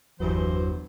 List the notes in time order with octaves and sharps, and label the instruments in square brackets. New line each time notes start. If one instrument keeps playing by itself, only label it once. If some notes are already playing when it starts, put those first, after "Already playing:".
[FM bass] G1 [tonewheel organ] E2 F#3 [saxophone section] G2 E4 C5 [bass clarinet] E3